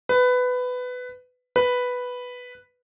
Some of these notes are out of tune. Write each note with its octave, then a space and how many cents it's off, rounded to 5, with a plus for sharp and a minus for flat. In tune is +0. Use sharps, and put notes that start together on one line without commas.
B4 +15
B4 +0